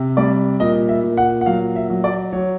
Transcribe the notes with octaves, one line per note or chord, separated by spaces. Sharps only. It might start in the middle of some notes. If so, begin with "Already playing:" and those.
Already playing: C3
G3 D5
A#2 D#5
E5
A#2
F#5
F#5
F#3 F5
E5
F#3
D5
F#3 C#5